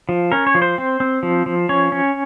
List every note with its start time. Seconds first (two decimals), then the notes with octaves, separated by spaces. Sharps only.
0.09 F3
0.32 C#4 A#4
0.47 C#5
0.55 F3
0.62 C5
0.78 C4
1.00 C4
1.23 F3
1.46 F3
1.69 C#4 C#5
1.92 C#4